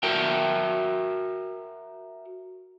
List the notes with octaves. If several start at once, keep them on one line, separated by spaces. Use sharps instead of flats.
F#4 A#4 E5 G5